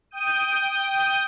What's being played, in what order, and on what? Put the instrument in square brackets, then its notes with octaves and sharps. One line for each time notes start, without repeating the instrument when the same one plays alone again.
[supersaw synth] G5 D#6 G6 D#7